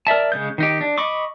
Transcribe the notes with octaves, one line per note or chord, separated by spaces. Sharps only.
A#4 D5 E5 A5
C#3 G#3 G6
D#3 D#4 G4
D4
D#5 B5 C#6 D6